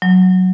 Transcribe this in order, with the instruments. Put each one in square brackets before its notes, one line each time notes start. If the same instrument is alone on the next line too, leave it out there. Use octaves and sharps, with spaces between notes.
[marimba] F#3